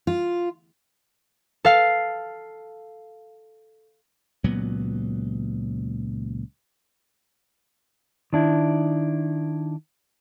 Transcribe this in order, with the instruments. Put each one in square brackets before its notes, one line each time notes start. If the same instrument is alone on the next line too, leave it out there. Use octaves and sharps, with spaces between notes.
[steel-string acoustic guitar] F4
[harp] A4 F5
[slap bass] C#2 A#2 F#3 B3
[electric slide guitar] D#3 D4 E4